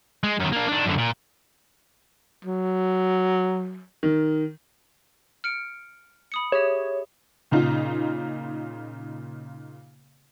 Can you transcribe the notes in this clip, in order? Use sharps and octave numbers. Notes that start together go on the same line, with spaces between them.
G#3
F#2 D#3
A#3 D4
D#3 D4
F#2 D3
A#2
F#3
D#3
F6 C#7 D7
B5 D#6 C#7
G4 G#4 C#5 E5
A#2 C#3 D#4 F4